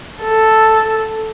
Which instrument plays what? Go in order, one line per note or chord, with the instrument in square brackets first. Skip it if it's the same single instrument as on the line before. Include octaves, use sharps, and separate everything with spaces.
[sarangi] A4